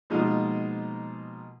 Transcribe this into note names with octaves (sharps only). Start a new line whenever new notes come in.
B2 F3 G#3 A#3 D#4 F4